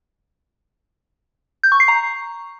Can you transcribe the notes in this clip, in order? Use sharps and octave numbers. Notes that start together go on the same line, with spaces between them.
G6
C#6
C7
A#5